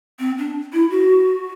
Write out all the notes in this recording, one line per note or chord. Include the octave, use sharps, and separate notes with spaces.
C4
D4
E4
F#4